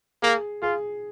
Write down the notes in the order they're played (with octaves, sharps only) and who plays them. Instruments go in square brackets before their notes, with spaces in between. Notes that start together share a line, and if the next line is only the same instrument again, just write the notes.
[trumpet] A#3 [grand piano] G#4
[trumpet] F4 [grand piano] G#4